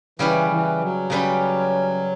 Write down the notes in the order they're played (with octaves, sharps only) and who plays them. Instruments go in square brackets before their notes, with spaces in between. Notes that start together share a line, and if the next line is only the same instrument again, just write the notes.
[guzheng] C#3 G3 C#4 G4 B4 [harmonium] E3
[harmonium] E3
F#3
[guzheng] C#3 G3 C#4 G4 B4